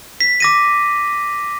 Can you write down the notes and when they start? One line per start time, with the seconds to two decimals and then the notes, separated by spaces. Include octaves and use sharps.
0.20 B6
0.40 D6 A#6 D#7